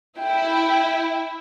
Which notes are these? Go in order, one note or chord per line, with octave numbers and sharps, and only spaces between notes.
E4 G5